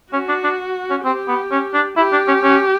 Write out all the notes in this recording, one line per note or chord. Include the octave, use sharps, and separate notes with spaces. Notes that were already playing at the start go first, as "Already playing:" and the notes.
C#4 F#4
D4
D4
C#4
C4 G4
B3
C#4
D4
E4 G4
D4
C#4
C#4